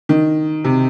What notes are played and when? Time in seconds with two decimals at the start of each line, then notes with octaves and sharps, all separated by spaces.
0.09 D#3
0.64 C3